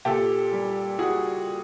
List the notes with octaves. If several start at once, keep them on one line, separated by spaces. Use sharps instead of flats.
A#2 G4 A4
G3
G3 F#4 G#4